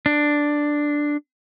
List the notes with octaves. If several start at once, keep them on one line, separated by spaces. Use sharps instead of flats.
D4